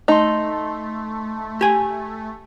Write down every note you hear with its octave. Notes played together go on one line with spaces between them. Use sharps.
A3 D#4 A5 C6
G4 G#5